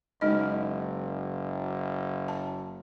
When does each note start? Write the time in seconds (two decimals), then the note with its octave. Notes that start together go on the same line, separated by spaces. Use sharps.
0.21 F#1 G#3 D#4 D#5
2.28 A5